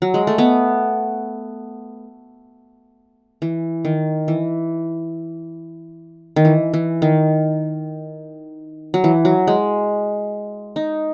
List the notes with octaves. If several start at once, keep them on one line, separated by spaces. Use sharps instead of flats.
F#3
G#3
A3
B3
E3
D#3
E3
D#3
E3
E3
D#3
F#3
E3
F#3
G#3
D#4